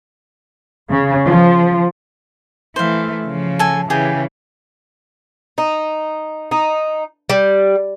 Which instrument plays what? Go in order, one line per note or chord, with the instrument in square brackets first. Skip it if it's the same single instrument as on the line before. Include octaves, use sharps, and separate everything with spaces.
[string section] C#3
F3
[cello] E3 A3 [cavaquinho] C5 F5
[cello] C#3 F3
[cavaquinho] A4 G#5
[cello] C#3 E3 [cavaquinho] G4 G#4
[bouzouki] D#4
D#4
G3